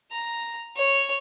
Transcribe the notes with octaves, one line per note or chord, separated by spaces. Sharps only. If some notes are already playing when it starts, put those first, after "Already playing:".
A#5
C#5